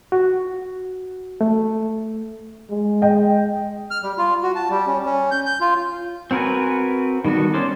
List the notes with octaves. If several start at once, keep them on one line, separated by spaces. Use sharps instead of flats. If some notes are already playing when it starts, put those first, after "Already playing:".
F#4
A3
G#3
D#5 G5
F6
G3
F4
F#4
A5
G3
C#4
C#4
G6
G6
F4
C4 F#4 A#4 B4 G#5
D#3 G3 B3 F#4 A4
C#4 C5 D5